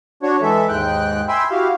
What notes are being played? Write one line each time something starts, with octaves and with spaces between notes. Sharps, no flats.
D4 F#4 C#5
E3 G#3 A4 E5
D#2 G#2 G#3 G5 F#6
E5 G5 G#5 B5 C6 E6
E4 F#4 G4 F5